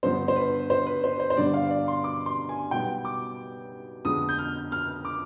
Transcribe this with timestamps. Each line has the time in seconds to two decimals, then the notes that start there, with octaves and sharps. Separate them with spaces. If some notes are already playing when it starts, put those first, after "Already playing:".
0.03 G2 D3 F3 B3 C5
0.28 C5
0.36 B4
0.70 C5
0.87 B4
1.04 C5
1.20 C5
1.30 C5
1.37 G2 D3 G3 B3 D5
1.54 F5
1.71 D5
1.88 C6
2.04 D6
2.26 C6
2.49 G#5
2.71 B1 B2 G3 B3 G5
3.05 D6
4.05 F2 D3 G#3 B3 D#6
4.29 G6
4.39 F6
4.72 F6
5.05 D6